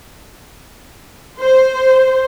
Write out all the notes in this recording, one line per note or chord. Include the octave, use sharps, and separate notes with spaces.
C5